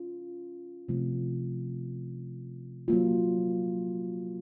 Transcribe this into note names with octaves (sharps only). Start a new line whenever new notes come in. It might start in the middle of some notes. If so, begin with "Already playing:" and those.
Already playing: C#4 F4
C3 F3 A3 C4 F4
F#3 A#3 F4